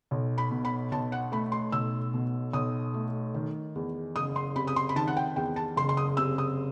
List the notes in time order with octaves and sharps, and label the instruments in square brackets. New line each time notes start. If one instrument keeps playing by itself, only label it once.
[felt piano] B1
B5
B2
B5
B1 A5
F#5
A3 B5
C6
B1 E6
B2
B1 D#6
A3
D#3
E2
F#1 D#6
C6
C3 B5
D#6
C6
B5
D#3 A5
F#5
G5
E2 G5
A5
F#1 C6
C6
D#6
C3 E6
D#6